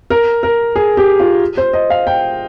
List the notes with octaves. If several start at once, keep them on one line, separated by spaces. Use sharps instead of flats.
A#4
A#4
G#4
G4
F4
C5
D#5
F5
G5